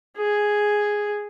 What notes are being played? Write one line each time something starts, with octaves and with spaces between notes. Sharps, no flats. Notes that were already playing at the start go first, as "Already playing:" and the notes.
G#4